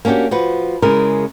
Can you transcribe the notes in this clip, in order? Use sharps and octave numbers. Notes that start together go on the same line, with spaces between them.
A#3 C#4 D4 F#4 G4
F3 F#4 B4
C#3 G#3 E4 A#4